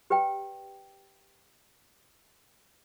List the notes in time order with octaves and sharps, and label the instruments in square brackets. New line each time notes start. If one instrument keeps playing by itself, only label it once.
[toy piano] G4 B4 D5 G5